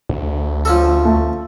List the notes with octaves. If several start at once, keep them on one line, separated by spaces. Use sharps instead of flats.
D2
F3 C#4 A4
A3